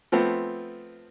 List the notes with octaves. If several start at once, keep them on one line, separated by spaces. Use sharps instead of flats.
F3 A3 B3 C4